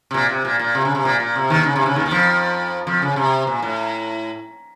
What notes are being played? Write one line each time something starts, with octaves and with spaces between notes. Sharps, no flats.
C3
A#2
C3
A#2
A#2
C3
C#3
C3
A#2
A#2
C3
D#2 D#3
C#3
C3
C#3
D#2 D#3
D#3
F2 F3
F2 F3
C#3
C3
A#2
A2